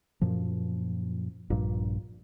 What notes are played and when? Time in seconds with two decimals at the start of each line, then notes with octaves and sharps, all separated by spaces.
0.21 F#2 A#2 F3
1.50 A#1 G2 A#2